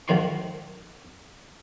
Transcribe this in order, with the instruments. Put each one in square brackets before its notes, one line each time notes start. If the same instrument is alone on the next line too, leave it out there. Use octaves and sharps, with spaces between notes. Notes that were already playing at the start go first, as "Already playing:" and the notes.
[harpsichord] G#2 D#3 F3 F#4 C6 C#6